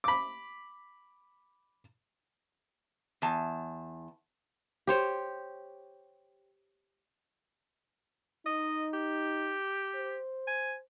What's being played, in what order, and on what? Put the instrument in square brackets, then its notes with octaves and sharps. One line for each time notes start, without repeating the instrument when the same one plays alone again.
[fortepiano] B5 D6
[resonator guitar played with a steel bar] E2 A5
[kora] G4 C5 C#5
[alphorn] D#4 [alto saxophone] D#5
[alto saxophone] G4
[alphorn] C5
[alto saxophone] G#5